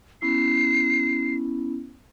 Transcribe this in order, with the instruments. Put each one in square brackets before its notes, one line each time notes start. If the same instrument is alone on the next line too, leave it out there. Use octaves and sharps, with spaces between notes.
[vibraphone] B3 C#4 E4 [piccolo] C7